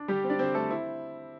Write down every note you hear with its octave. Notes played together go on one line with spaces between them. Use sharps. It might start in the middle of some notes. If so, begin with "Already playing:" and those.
Already playing: D4
D3 G3 G4
C4
D4 D5
D3 C4 C5
A3 C4 A4
C4 E4